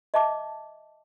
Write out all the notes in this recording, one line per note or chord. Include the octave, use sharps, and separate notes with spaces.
D#5 E5 A5 D6